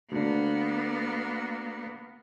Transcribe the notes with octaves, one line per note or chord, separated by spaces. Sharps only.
D2 D3 A#3 B3